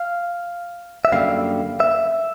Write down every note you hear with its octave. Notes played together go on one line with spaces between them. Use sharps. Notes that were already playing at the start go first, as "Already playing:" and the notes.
Already playing: F5
E5
F#2 D3 G3 A#3 F5
E5